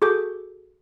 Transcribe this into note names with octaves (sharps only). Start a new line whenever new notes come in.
F#4 G#4 A4 D6 G6